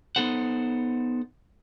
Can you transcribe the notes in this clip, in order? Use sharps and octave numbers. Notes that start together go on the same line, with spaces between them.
B3 D#4 A4 C5 F#5